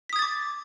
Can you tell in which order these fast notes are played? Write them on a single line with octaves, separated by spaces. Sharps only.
B6 D#6 G#6 A6 D6